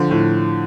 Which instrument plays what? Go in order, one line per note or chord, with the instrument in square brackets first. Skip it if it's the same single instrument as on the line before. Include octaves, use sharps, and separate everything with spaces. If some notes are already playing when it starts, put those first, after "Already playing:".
Already playing: [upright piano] D3 [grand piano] F3
[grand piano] A2